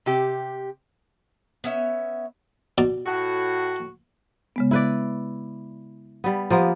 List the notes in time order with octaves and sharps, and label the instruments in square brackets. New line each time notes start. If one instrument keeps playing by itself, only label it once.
[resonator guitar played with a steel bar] C3 G4
[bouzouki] B3 C#4 E5
[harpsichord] B2 D5 A#5
[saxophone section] A2 F#4
[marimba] C#3 G#3 B3
[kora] E4 B4 D5
G3 B3
[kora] F3 A#3 B3 [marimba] G4 F#5 C6